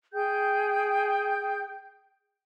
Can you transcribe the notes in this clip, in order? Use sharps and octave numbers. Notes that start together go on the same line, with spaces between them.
G#4 G5 G6